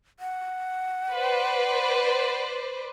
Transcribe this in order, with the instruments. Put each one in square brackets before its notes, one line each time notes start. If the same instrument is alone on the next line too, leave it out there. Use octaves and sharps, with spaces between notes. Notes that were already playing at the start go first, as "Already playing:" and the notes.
[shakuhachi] F#5
[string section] B4 C5 D5